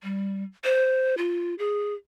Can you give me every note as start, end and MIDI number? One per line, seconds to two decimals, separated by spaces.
0.03 0.44 55
0.64 1.15 72
1.18 1.55 65
1.59 1.94 68